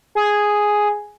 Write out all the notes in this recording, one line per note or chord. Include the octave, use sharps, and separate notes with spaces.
G#4